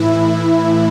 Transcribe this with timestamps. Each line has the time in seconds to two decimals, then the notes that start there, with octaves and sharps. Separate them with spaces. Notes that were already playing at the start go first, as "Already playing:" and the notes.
Already playing: A2 E3 E4